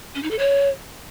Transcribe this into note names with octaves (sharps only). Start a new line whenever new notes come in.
C#4
D#4
A4
C#5